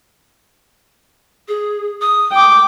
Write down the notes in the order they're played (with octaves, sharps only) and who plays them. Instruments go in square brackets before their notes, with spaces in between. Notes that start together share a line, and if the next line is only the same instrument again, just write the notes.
[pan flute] G#4
D#6
[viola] G5 D6